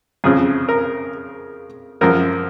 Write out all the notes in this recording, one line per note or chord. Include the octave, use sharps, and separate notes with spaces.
F2 C#3 F3 G#4
A#4
F#2 F3 A#4